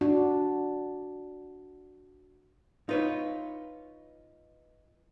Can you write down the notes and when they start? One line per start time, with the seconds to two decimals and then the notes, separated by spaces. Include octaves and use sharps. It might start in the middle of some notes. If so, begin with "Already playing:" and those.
0.01 D4 F#4
2.89 D#4 F4 B4 C#5